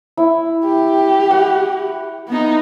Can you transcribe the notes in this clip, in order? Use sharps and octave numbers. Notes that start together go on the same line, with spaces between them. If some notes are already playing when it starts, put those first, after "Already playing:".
E4
G4
F#5
B3 D#4